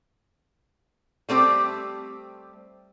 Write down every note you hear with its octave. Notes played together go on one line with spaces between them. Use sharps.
G3 A3 C4 G4